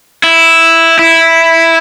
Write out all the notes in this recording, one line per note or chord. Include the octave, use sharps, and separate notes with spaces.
E4
E4